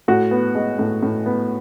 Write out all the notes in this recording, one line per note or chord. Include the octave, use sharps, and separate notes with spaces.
A2 F#4
B3
G#3
A2
A2
B3